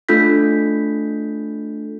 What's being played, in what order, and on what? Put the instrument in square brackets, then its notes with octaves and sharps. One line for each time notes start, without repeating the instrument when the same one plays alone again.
[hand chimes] A3 D4 F4 A4 G6 B6